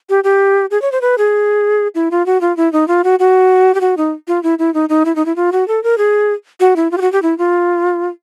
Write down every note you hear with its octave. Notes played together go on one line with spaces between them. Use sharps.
G4
G4
G#4
C#5
C5
B4
G#4
E4
F4
F#4
F4
E4
D#4
F4
F#4
F#4
G4
F#4
D#4
F4
E4
E4
D#4
D#4
E4
D#4
E4
F4
F#4
A4
A#4
G#4
F#4
E4
F4
G4
F#4
G4
E4
F4